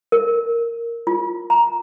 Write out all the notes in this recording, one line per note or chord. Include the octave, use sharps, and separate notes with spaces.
A#4
F4
A#5